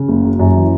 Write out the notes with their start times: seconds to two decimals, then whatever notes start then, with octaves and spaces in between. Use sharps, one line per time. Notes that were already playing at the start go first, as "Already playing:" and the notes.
Already playing: C#3
0.09 F#1
0.24 F#3
0.39 F#2
0.56 E3